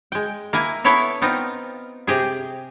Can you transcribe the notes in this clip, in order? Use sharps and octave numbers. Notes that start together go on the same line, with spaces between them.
G#3 G5
A#3 E4 G#5
B3 E4 A4 C#5 E5
B3 C4 D#4 F4
C3 G4 G#4